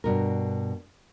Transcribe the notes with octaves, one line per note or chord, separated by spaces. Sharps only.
G2 B2 A#4